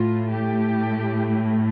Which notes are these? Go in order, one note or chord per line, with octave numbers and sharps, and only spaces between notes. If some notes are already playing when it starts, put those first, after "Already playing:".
Already playing: A2 A3 F4
G4